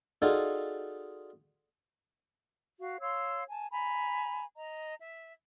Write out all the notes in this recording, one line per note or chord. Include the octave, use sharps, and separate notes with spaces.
D#4 F4 F#4 G#4 A4 D5
F#4 F5
C#5 F5 C6 E6
G#5 A5
G#5 A#5 B5
D#5 A#5
E5